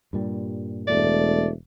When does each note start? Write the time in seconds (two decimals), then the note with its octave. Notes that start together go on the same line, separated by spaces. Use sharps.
0.13 G2 A#2 G3
0.87 E1 A3 D5